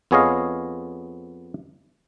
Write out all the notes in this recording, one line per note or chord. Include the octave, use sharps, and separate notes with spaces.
F2 B3 G#4 C#5 D#5 F5